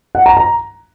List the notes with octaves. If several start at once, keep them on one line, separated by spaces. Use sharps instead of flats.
F#5
A#5
A#5